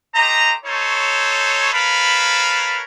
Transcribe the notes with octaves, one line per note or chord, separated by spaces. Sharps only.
A3 G4 C5 D#5 A#5
D#4 A4 C5 C#5
A#4 B4 C#5 F5 A5 B5